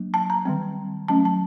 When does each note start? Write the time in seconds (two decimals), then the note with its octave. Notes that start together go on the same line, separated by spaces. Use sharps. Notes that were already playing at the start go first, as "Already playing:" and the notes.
Already playing: F#3 A#3 D4
0.14 A5
0.30 A#5
0.45 D#3 G3 C4
1.08 F#3 A3 C#4 A5
1.25 A5